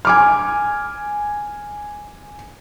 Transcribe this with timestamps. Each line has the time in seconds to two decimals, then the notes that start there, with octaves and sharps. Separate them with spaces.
0.05 G#5 D6 F6